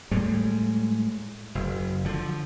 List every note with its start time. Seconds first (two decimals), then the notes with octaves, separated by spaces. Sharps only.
0.11 A2 G3 G#3
1.55 F#1
2.05 D3 F3